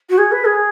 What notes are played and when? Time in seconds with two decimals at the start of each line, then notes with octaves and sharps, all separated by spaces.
0.10 F#4
0.18 G#4
0.32 B4
0.46 G#4